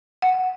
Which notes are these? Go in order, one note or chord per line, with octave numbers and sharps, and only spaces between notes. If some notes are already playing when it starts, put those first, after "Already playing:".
F#5